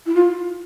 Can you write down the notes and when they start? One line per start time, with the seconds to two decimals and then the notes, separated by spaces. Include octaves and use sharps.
0.06 E4
0.14 F4